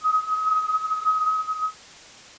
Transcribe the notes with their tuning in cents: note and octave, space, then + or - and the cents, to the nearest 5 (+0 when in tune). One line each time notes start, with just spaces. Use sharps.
D#6 +35